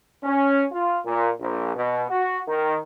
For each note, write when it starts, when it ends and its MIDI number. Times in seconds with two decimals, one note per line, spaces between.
0.23 0.64 61
0.72 0.99 65
1.05 1.31 46
1.39 1.71 34
1.76 2.03 47
2.09 2.39 66
2.48 2.78 51